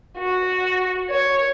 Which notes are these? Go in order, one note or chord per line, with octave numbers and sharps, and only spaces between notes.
F#4
C#5